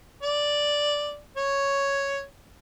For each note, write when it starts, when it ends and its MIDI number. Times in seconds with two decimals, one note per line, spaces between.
0.23 1.18 74
1.36 2.22 73